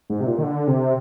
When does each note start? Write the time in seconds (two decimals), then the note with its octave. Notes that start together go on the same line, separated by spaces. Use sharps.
0.10 G#2
0.21 C3
0.26 A#2
0.38 D#3
0.43 D3
0.67 C3